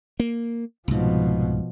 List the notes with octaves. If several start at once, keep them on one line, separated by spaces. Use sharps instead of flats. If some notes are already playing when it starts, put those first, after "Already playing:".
A#3
C2 G#2 B2 F3